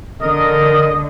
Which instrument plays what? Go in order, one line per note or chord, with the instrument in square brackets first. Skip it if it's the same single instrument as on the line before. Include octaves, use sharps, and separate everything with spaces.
[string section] D3 [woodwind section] A#4 [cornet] D#5 [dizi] D#6